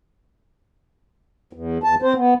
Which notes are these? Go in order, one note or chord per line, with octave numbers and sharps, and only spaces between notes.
E2
E2 A5
C4 C5
B3